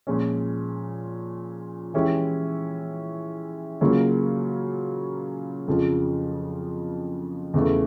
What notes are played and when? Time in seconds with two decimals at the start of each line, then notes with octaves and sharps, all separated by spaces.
0.07 A#2 F3 G#3 C#4
1.94 E3 G#3 C#4 E4 G4
3.81 C#3 F#3 A#3 C#4 F4
5.68 F2 C#3 F3
7.54 E2 C#3 E3 A3